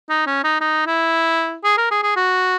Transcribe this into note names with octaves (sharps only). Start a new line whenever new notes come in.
D#4
C#4
D#4
D#4
E4
G#4
A#4
G#4
G#4
F#4